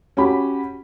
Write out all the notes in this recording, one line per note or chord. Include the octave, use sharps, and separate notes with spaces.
C#4 F#4 G4 B5